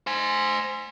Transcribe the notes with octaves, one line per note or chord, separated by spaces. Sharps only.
C5 G#5